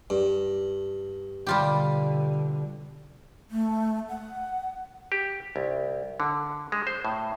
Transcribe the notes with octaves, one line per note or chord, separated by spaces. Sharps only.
G2
B2 D3 G3 F4 G4
A3
F#5
G4
C2
D3
G#3
C5
A2